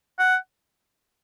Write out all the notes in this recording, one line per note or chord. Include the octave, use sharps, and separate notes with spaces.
F#5